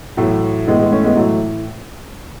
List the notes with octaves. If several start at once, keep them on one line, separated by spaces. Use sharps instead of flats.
A2 E3 F#3 A3
A2 E3 G#3 B3
G#3 B3
A3 C#4
G#3 B3
A2 E3 F#3 A3